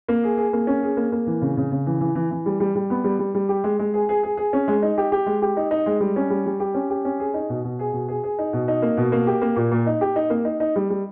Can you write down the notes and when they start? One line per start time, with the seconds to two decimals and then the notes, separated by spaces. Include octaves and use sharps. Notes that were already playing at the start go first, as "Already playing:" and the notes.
0.08 A#3
0.24 G#4
0.37 G#4
0.53 A#3
0.67 C#4
0.83 G#4
0.97 A#3
1.12 A#3
1.27 E3
1.42 C#3
1.57 C#3
1.72 C#3
1.86 E3
2.01 E3
2.15 E3
2.31 E3
2.46 G3
2.60 G3
2.75 G3
2.90 B3
3.04 G3
3.19 G3
3.34 G3
3.49 G4
3.64 G#3
3.79 G#3
3.94 G#4
4.09 G#4
4.23 G#4
4.37 G#4
4.53 C#4
4.68 G#3
4.82 D#4
4.98 G4
5.12 G4
5.26 G#3
5.42 G4
5.57 D#4
5.71 D#4
5.86 G#3
6.00 G3
6.16 C#4
6.30 G3
6.46 G3
6.60 G4
6.74 C#4
6.90 G4
7.05 C#4
7.20 G#4
7.34 D#4
7.49 B2
7.64 B2
7.79 G#4
7.93 B2
8.09 G#4
8.23 G#4
8.39 D#4
8.53 B2
8.68 D#4
8.82 A#3
8.97 B2
9.12 A#3
9.27 G4
9.42 A#3
9.56 A#2
9.72 A#2
9.86 D#4
10.01 G4
10.16 D#4
10.30 A#3
10.45 D#4
10.60 D#4
10.76 G3
10.90 G3